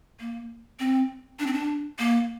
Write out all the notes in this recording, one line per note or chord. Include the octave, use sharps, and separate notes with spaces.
A#3
C4
D4
C4
D4
A#3